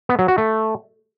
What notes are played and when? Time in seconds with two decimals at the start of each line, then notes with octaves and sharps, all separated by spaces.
0.09 B3
0.19 F#3
0.28 F#4
0.38 A3